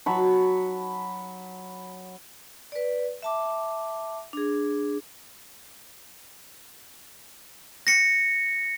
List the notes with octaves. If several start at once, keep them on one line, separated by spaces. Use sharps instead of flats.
F#3 A5 B5 C#6
B4 D5
E5 A5 D6
D4 G#4
A#6 C#7